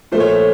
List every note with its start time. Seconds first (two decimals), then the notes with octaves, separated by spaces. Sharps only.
0.12 A#2 F3 A3 C5
0.20 C#5
0.29 C5